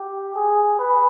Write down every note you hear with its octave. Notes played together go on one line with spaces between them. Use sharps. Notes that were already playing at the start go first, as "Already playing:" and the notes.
Already playing: G4
G#4
B4